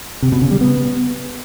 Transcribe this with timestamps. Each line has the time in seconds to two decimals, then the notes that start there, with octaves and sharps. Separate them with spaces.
0.22 C3
0.32 B2
0.42 C#3
0.51 G3
0.61 B3